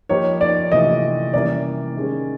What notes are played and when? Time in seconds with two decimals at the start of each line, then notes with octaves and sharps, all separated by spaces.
0.09 F3 A#3 D#4 G4 C#5
0.41 D5
0.72 C3 E3 A3 D4 F4 D#5
1.33 C3 E3 G3 A#3 C#4 D5
1.96 D#3 G#3 C#4